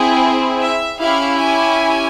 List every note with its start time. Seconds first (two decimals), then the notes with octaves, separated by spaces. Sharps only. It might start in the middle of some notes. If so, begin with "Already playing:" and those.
Already playing: C4 E4 G#4
0.60 E5
0.99 C#4 E4 G4 F5
1.38 G#5